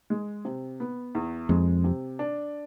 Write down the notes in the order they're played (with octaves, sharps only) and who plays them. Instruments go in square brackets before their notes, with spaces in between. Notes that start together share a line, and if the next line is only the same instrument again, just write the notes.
[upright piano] G#3
C3
B3
E2
[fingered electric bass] F2 [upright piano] G#3
[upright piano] C3
D4